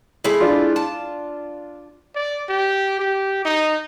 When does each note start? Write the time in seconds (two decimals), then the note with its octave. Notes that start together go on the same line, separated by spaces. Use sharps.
0.24 G#3 A3 E4
0.40 D4 F4
0.76 A5
2.15 D5
2.49 G4
2.99 G4
3.45 D#4